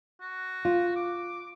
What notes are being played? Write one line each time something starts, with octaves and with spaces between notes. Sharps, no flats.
F#4
F4
D6